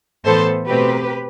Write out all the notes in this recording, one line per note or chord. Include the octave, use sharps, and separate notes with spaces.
A2 E3 B3 A4 C5
B2 A3 C4 G4 B4